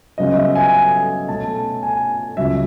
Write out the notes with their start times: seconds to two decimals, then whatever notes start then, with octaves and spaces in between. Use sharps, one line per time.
0.18 F#2 C#3 F#3 B3 D#5
0.36 E5
0.55 G#5
0.73 G#5
1.28 B2 A3 C#4 A5
1.83 G#5
2.37 C#2 C#3 F#3 E5